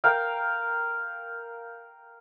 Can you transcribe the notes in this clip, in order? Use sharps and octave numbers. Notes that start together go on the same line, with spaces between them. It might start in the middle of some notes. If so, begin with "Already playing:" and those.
A#4 F5 G5